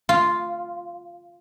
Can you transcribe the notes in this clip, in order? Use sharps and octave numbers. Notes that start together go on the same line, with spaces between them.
F4